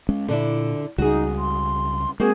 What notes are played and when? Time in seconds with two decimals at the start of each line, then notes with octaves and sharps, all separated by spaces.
0.09 G#3 C#4
0.28 A#2 D3 D4 E4
0.98 C#2 C#3 G3 D#4 F#4 G#4
1.38 C6
2.20 G#3 A#3 C4 F#4 G#4